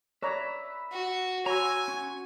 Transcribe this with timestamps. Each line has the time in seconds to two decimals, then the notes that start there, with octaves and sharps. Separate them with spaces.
0.23 B4 C#5 D5 E5 A#5
0.92 F#4
1.46 F#4 C#5 G#5 A#5 C6 E6
1.88 C#4 C#6